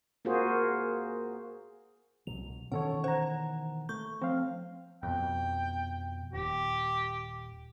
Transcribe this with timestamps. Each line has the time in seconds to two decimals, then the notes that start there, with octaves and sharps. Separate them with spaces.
0.25 A#3 F4 F#4 G#4 C5
2.27 C2 B2 F#3 F7
2.72 B2 D#3 E3 C#4 A4 C#5 F#5
3.04 C5 F#5 A#5
3.89 A3 C#6 G6
4.22 F3 C4 F5
5.03 F2 B2 G5
6.33 D#1 G4